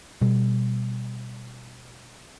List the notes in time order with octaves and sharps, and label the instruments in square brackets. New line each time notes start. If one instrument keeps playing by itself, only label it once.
[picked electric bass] B2 G3